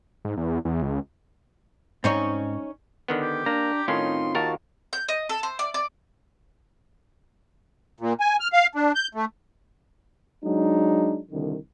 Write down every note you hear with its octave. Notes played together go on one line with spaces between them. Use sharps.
G#2
E2
E2
C#2
G#2 C4 C#4 D#4 C#5
D3 D#3 B3
G4
A#3 D4 A#5
A2 D#3 C4 C#4 D#4 F4 C6
D#2 F4 F#4 A#4 A5
G6
D#5
A4
C5
D5
D5
A#2
G#5
F6
F5
D4
G6
A3
F#3 G#3 D4 D#4
C2 D3 D#3